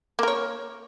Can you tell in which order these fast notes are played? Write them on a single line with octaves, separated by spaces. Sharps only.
A#3 A#4 C#5